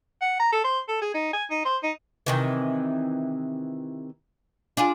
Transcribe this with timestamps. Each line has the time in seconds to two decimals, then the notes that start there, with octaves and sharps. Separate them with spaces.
0.21 F#5
0.40 A#5
0.52 A4
0.64 C5
0.88 A4
1.02 G#4
1.14 D#4
1.33 G#5
1.51 D#4
1.65 C5
1.83 D#4
2.26 C3 D#3 E3
4.77 D4 F4 G#4